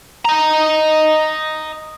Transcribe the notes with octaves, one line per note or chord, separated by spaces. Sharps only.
D#5 A#5